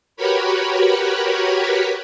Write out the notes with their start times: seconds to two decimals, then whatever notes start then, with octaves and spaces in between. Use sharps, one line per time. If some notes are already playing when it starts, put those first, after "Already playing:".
0.17 F#4 G4 A#4 B4 C#5 B5